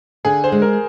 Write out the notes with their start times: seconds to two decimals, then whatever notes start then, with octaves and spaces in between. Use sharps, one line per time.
0.25 D3 G#4
0.44 C5
0.52 G#3
0.62 A#4